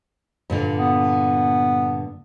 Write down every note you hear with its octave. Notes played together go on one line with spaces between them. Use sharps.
G2 A#2 D3
B3